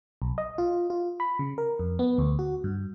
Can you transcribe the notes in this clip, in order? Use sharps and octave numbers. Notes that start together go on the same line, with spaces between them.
B1
D#5
F4
F4
B5
C#3
A#4
F2
B3
D2
F#4
G2